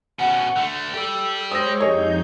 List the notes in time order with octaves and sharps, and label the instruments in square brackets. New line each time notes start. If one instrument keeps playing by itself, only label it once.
[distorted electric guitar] B2 C#4 [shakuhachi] F#5
[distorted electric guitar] D3 A3
[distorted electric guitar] G4 D5 [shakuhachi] A4
[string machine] G#3 C#5 C#6 [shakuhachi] C5 [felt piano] D#6 E6 A#6
[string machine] F2 D#4 G6 [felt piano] G4 G#4 C#5 [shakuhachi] D#5